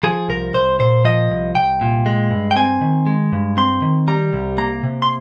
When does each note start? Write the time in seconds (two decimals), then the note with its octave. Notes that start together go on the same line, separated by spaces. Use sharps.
0.03 F3 G#4
0.29 C2 A#4
0.54 C2 C5
0.80 A#2 C5
1.05 F3 D#5
1.31 C2
1.55 C2 G5
1.81 A#2
2.06 G#3
2.30 G2
2.51 G5
2.56 C4 G#5
2.81 D#3
3.06 G#3
3.33 G2
3.57 C4 C6
3.82 D#3
4.08 G3 A#5
4.33 C2
4.58 A#3 A#5
4.83 C3
5.02 C6